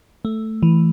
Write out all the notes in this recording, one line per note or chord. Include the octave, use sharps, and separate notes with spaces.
A3
E3